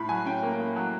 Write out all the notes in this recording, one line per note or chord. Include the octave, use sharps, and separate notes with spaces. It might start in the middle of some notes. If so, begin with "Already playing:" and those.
Already playing: A2 B5
F#3 G#5
C#4 G5
A#3
A2
F#3